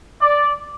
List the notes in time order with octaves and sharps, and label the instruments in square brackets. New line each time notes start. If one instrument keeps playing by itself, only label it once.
[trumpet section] D5